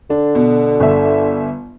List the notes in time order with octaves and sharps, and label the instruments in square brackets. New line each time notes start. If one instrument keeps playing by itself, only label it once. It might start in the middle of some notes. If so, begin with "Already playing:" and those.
[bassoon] D3 [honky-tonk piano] D4
[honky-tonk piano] B2
G1 E5